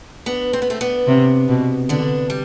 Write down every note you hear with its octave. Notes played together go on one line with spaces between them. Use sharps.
B3 D4
C4
B3
A3 C4
B3 D4
C3
B2
D3 B3 D4
G3